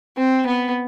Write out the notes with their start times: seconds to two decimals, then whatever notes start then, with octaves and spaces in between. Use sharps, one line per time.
0.18 C4
0.46 B3